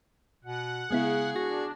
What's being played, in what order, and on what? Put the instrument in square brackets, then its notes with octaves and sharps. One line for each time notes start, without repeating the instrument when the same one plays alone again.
[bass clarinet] B2 [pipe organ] F#5
[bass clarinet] C#3 [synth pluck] G#3 B3 E4 [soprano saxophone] G#4
[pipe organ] D4 [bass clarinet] F#4 [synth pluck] A#6